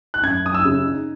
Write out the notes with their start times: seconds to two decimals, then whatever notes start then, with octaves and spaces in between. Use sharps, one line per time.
0.14 F#6
0.23 F#2 G#6
0.45 F#2 D#6
0.54 E6
0.65 C#3
0.86 D#4